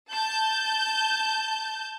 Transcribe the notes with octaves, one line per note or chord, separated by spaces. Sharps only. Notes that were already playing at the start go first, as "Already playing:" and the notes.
A5 G6